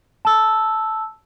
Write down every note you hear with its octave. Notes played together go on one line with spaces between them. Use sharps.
A5 E6